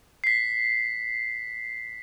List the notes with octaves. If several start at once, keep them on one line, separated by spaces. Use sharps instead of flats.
B6 C7